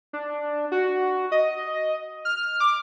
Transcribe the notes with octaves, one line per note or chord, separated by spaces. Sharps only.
D4
F#4
D#5
F6
D6